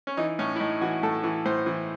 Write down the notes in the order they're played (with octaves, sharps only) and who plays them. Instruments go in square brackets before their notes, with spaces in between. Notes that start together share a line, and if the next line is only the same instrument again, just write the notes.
[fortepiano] C#4
E3 D#4
A2 C#4
E4
A2 D#4
E3 F#4
A2 A4
E3
A2 C5
E3